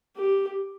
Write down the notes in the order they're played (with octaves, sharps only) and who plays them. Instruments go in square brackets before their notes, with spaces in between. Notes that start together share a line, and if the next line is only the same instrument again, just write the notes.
[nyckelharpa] G4